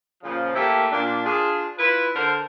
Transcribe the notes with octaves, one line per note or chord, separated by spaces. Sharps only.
A#2 C#3 F3
A3 A#3 E4 G4 A4
A#2 D4
D4 F4 G#4
E4 F4 B4
D3 A4 A#4 C5